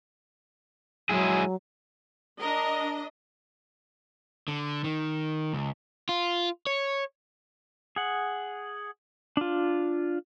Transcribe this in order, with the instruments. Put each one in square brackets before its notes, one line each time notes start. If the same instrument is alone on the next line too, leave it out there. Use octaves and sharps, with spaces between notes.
[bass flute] F#3 [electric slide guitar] G#3 E4 G#4
[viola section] D4 D#5 [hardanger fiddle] A#4
[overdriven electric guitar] D3
D#3
C#2
F4
C#5
[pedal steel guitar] G#4 F#5
D4 F4